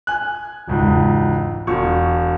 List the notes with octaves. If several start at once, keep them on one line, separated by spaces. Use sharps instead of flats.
G#5 F#6
E1 C#2 G#2
E1 C#6